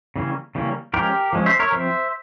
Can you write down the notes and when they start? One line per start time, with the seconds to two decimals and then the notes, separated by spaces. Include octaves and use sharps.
0.16 C#3 E3 G3 A#3 C#4
0.55 C#3 E3 G3 A#3 C#4
0.94 F3 G#3 C#4 G4 A#4
1.33 F3 G#3 C#4
1.46 C5 E5
1.60 A#4 C#5
1.72 F3 C4 C5 E5